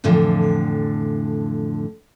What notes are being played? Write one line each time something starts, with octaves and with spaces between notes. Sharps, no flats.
F2 A2 D3 E3 F3